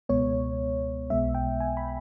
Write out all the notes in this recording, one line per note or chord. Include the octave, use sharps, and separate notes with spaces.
C#2 B2 G#3 B3 C#5
B1 B2 G#3 B3 E5
G5
G#5
B5